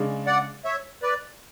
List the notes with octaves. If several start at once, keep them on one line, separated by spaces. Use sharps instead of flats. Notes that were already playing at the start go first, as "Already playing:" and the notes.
Already playing: C#3 G#3 D4
D5 F#5
C#5 E5
B4 D5